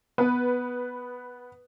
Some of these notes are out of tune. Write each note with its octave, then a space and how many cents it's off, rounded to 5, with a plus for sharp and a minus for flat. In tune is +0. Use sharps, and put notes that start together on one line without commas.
B3 +0 B4 +0